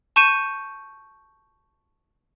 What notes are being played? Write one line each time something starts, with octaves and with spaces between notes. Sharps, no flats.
A5 C#6 G6 C#7 D#7 E7